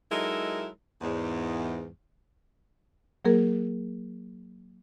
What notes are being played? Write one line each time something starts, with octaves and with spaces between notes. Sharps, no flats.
F#3 G#3 D#4 E4 A4 A#4
E2 G#2
F#3 A#3 G#4 A#4